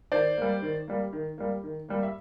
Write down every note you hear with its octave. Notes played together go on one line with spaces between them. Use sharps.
D#3 C5 D5
G3 A#3
D#3
G3 A#3
D#3
G3 A#3
D#3
G3 A#3
E5